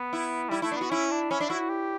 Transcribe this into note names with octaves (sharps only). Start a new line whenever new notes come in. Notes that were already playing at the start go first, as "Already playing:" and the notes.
Already playing: B3
E4
G3 E4
A3 E4
D4
B3 F#4
C#4 E4
D4
C#4 E4
D4
E4 F#4
G4